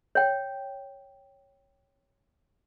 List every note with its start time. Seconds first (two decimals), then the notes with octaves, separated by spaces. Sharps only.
0.15 C#5 G5